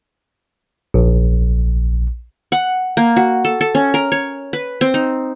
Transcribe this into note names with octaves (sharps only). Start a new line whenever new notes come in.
A#1
F#5
A#3
F#4
A4
A4
C#4
A#4
C#5
B4
C4
D#4